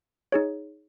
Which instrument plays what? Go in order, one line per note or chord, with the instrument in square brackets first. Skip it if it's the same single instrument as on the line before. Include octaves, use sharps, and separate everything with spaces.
[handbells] D#4 G#4 C#5